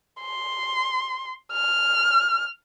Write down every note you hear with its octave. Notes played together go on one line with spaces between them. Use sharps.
C6
F6